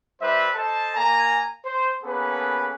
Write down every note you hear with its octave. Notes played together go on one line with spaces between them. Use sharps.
G3 D#4 B4 C5 E5
A4 C5 D#5 A5
A#3 G#5 A#5
C5
A#3 B3 C#4 G#4 A4 B4